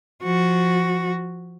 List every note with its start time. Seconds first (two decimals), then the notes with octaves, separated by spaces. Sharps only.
0.23 F3 F#4